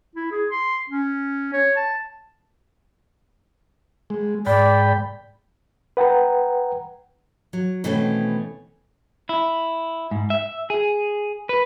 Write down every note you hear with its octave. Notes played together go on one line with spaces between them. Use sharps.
E4
G#4
C6
C#4
C#5
A5
G#3
G#2 D5 G5 B5
B4 F#5 G5 A#5
F#3
B2 D#3 E3 A3 C4 C#4
E4
G#2
E5
G#4
B4